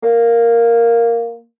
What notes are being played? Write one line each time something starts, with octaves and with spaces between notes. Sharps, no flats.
A#3